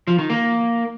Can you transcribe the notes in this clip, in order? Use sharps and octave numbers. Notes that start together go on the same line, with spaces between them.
F3
D#3
A#3